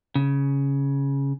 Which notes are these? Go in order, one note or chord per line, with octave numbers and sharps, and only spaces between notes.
C#3